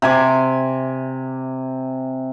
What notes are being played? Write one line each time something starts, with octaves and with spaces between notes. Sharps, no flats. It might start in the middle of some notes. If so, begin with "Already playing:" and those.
C3 G#5 D6